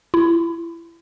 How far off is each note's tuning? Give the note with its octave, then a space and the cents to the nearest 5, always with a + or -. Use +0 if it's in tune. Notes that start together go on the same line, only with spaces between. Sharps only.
E4 +30